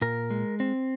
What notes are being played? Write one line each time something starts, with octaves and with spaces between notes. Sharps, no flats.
A#2 A#4
G#3
C4